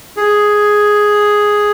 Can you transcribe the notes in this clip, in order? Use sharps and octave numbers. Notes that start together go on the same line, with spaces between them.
G#4